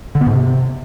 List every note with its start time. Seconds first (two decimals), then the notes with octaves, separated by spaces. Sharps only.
0.15 D3
0.21 B3
0.27 G#2
0.33 C3